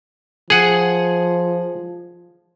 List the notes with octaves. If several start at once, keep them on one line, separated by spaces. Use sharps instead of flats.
F3 G#4 F#5